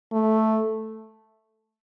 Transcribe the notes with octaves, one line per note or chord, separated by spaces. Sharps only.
A3